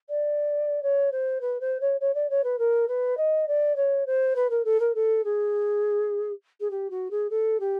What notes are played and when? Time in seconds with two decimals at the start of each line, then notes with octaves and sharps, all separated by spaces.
0.09 D5
0.83 C#5
1.12 C5
1.41 B4
1.60 C5
1.80 C#5
2.00 C#5
2.14 D5
2.30 C#5
2.44 B4
2.59 A#4
2.88 B4
3.17 D#5
3.48 D5
3.76 C#5
4.06 C5
4.36 B4
4.50 A#4
4.65 A4
4.80 A#4
4.95 A4
5.24 G#4
6.60 G#4
6.70 G4
6.90 F#4
7.11 G#4
7.30 A4
7.60 G4